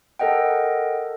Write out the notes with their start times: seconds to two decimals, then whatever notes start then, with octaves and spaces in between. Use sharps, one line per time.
0.19 A4 A#4 D#5 F#5 G5